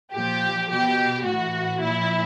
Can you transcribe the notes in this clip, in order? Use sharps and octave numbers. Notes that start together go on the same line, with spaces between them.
A#2 F3 G4
B2 G4
A2 E3 F#4
A#2 F3 E4